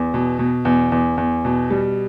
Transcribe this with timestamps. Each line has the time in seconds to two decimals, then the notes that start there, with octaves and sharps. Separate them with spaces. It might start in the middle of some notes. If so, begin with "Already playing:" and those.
Already playing: E2
0.14 B2
0.39 B2
0.65 E2
0.92 E2
1.18 E2
1.45 B2
1.70 G3